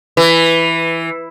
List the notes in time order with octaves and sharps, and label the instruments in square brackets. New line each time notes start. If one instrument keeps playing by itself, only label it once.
[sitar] E3